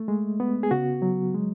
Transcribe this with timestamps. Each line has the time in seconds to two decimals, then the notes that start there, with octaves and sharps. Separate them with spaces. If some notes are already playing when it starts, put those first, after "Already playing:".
Already playing: A3
0.08 G#3
0.40 B3
0.63 G#4
0.71 C#3 F#4
1.02 F#3
1.34 G#3